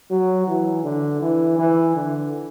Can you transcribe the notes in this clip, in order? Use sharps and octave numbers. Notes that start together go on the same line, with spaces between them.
F#3
E3
D3
E3
E3
D3